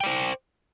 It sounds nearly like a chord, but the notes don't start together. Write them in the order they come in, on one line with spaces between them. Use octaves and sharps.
G5 D5 C5